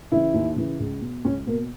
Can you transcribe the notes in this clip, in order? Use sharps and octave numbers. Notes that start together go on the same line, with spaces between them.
C#3 E3 E4
D#2
C#3 E3
C#2
B2
C#2 C#4
B2 A#3